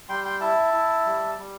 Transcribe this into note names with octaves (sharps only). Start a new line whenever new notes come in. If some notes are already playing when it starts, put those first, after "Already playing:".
G3 G5 C6
G5 C6
E4 E5 A5
E4
G3
G3